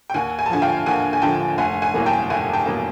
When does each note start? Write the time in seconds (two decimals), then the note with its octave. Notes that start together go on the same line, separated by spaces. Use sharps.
0.10 G5
0.14 D#2 F#5 G#5
0.39 G#5
0.46 A5
0.50 D3 F3 F#5 G#5
0.62 F5 G5
0.86 D#2 F#5 G#5
1.13 G#5
1.22 D3 F3 G5 A5
1.58 F1 F#5 G#5
1.82 F#5 G#5
1.94 E2 B2 F#3 A#3
2.06 G5 A5
2.30 F1 F#5 G#5
2.53 G5 A5
2.66 B2 F#3 A#3